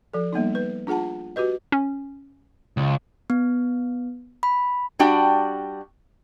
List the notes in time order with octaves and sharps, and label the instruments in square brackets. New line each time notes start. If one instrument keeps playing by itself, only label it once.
[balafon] F3 A4
G3 A#3 B3 D#4
B4
D4 F4 G#4 F#5 A5
F#4 G4 B4 D#5
[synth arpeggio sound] C#4
[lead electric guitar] C#2
[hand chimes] B3
B5
[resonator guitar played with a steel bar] G3 D4 F#4 G5